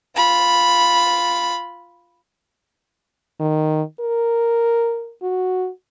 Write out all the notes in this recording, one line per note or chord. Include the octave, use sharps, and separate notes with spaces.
F4 B5
D#3
A#4
F#4